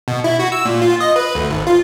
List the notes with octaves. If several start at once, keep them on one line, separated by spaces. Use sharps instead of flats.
B2
E4
F#4
E6
A#2
F4
D#5
B4
D2
G#1
F4